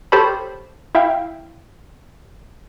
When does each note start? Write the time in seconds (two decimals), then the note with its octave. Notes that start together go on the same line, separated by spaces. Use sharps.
0.12 G4 A4 C5 C#5 A5 B5
0.95 E4 E5 F5 G5